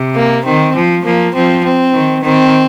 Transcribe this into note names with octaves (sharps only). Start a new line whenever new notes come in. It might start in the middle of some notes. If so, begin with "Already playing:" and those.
Already playing: C3
A#3
D#3 C4
F3
F3 A#3
F3 C4
C4
D#3
D#3 C4